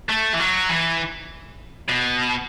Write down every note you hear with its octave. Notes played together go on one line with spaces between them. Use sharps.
A3
E3
F#3
E3
B2